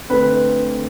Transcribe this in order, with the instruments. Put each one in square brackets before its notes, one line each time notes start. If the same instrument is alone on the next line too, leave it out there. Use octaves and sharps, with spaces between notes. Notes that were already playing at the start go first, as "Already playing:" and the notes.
[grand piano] D3 A3 C4 [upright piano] B4